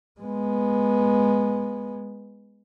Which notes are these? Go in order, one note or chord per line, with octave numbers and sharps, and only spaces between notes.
G#3 B3